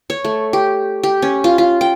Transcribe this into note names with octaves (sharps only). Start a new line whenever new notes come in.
C#5
A3
G4
G4
C#4
F4
F4
G5